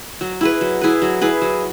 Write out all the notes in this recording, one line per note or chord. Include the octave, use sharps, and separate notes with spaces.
F#3
E4 G#4 B4
F#3
E4 G#4 B4
F#3
E4 G#4 B4
F#3